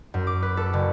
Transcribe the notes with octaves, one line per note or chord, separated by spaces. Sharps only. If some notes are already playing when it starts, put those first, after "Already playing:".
F#2
D6
B4
A4
F#1